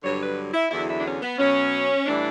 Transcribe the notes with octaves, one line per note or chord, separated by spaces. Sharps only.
G2 D3 F#3 C#5
B4
E4
E2 D3 F#3 E4
E4
D4
C#4
B3
B2 F#3 C#4
A2 E3 G3 D4